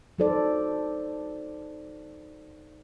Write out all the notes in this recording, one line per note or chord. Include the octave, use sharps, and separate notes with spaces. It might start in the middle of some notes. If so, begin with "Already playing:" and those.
F#3 D#4 A4 C5 D5